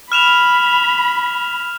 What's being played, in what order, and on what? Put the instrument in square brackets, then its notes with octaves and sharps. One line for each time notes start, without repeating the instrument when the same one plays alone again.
[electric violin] B5 [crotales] F6 E7 F7